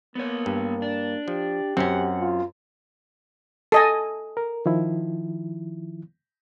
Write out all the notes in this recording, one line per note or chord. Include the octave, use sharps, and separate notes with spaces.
A#3 B3 C#5
G2
D4
F3 G4
F#2 C4 C#4 F#5
F4
A4 D#5 G#5
A#4
D#3 F3 E4